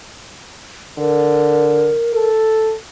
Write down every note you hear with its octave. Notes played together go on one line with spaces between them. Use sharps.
D3 A#4
A4